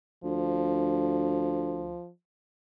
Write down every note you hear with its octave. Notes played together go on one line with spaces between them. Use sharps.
D2 F3